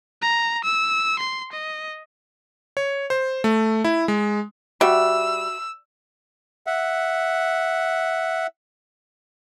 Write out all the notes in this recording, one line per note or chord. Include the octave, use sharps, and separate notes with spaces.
A#5
E6
C6
D#5
C#5
C5
A3
E4
G#3
G3 F#4 E5 E6
E5 F#5